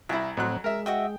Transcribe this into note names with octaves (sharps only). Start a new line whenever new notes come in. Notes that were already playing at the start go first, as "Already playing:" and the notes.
C2 E4 G#5 A#5
F2 A2 F#3 C4 F#6
G#3 A#4 E5
F#4 D#5 E5 G5